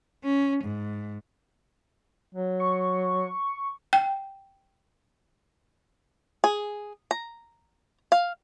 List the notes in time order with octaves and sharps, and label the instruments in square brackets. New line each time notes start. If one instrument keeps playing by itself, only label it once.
[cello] C#4
G#2
[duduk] F#3
[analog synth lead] C#6
[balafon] G5
[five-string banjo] G#4
A#5
F5